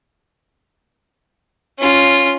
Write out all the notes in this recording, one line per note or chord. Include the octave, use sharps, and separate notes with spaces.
C#4 F4